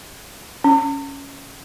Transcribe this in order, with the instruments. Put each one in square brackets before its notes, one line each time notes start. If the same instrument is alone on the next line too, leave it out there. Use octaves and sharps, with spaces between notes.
[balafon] C#4